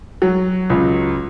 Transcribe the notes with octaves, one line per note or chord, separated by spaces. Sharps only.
F#3
C#2